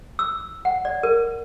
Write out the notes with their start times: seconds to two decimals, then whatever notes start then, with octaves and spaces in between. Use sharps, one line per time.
0.19 E6
0.65 F#5
0.85 D5
1.03 A#4